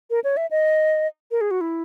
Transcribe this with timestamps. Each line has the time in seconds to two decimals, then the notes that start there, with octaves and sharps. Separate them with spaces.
0.10 A#4
0.24 C#5
0.37 E5
0.51 D#5
1.31 A#4
1.41 G#4
1.51 F#4
1.61 E4